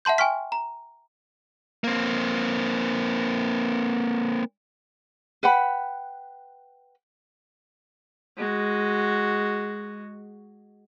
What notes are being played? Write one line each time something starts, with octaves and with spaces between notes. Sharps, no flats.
E5 F#5 A5 C6 G6
G5 G#5 C6 C#6 F6 B6
A#5
A#3 C4
B4 F#5 G5 B5
G#3 F#4